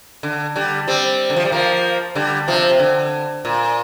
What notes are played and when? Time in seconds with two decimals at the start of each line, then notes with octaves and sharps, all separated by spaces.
0.23 D3
0.56 D3 G3
0.88 G3 C4
1.30 D3
1.36 F3
1.45 G3
1.52 F3 A#3
2.15 D3 G3
2.48 C3 F3
2.69 C3
2.79 D3
3.45 A#2